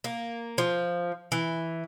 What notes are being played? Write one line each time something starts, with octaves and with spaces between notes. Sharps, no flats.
A#3
F3
E3